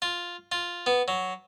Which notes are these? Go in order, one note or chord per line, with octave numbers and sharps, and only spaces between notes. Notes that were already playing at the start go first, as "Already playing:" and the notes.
F4
F4
B3
F#3